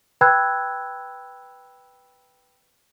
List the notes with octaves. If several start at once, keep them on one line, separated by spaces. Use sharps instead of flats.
B4 G5 B5 E6 F#6 G#6